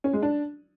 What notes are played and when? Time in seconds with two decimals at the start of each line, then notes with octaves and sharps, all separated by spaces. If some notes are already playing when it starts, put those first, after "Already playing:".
0.04 C#4
0.13 G#3
0.23 D4